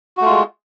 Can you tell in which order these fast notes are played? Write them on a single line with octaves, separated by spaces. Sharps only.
F#4 A3 F4 G#3